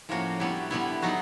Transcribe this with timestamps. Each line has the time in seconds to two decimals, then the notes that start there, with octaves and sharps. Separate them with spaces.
0.09 A2 F3 A#3 C#4 F#4
0.40 D3 G3 B3 E4
0.71 D3 G3 B3 E4
1.02 F#3 B3 D#4 F#4